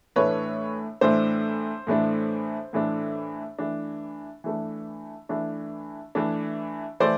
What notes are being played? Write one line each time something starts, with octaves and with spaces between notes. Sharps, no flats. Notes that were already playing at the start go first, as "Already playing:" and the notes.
A2 E3 A3 D4 B4 C#5
A2 E3 A3 D4 C5
A2 E3 A3 D4
A2 E3 A3 D4
E3 A3 D4
E3 A3 D4
E3 A3 D4
E3 A3 D4
E3 A3 C5 D5